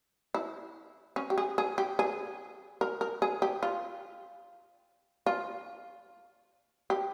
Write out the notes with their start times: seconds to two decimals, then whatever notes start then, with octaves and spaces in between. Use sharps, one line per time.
0.34 E4
1.16 C#4
1.30 G4
1.38 G#4
1.58 G#4
1.78 G4
1.99 G#4
2.81 A#4
3.01 A#4
3.22 G#4
3.42 G4
3.63 F4
5.26 F4
6.90 G4